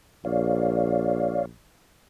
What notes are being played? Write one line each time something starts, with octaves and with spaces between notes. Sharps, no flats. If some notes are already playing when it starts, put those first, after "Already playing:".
A#1 C#5 D5 F5